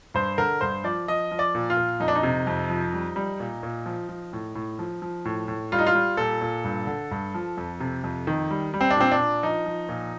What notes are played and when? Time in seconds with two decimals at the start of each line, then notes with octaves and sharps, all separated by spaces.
0.14 G2 C5
0.38 D3 A#4
0.61 G2 C5
0.84 F3 D5
1.08 F3 D#5
1.32 F3
1.39 D5
1.55 A#2
1.70 F4
1.77 A#2
2.00 F2 D#4
2.08 D4
2.15 D#4
2.23 C3
2.47 F2
2.70 F3
2.93 G3
3.16 G3
3.40 A#2
3.63 A#2
3.86 F3
4.09 F3
4.33 A2
4.55 A2
4.79 F3
5.02 F3
5.25 A2
5.48 A2
5.72 G3 F4
5.79 D#4
5.87 F4
5.95 G3
6.17 A#2 A4
6.41 A#2
6.64 G2
6.87 D3
7.11 G2
7.34 F3
7.57 F2
7.80 C3
8.04 F2
8.27 D#3
8.51 G3
8.74 G3
8.81 C4
8.90 D4
8.96 A#2 C4
9.11 D4
9.19 A#2
9.43 F3 D#4
9.66 F3
9.89 A#2